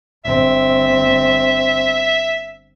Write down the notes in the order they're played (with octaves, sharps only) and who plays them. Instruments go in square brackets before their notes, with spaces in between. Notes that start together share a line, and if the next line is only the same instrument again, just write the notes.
[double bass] G1 C4 [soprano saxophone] E5